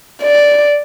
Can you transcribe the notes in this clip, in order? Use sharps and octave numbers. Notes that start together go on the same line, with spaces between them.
D5